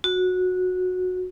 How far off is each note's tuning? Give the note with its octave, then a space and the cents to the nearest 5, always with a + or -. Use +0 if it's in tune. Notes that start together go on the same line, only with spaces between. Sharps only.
F#4 -15